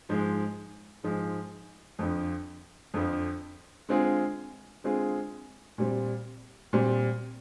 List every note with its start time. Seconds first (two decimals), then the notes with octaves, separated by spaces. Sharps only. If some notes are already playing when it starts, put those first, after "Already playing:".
0.09 G#2 F3 G#3
1.03 G#2 F3 G#3
1.99 F2 D3 F3
2.94 F2 D3 F3
3.89 D3 G#3 C4 F4 G#4
4.84 D3 G#3 C4 F4 G#4
5.78 A#2 G3 C4
6.73 A#2 G3 C4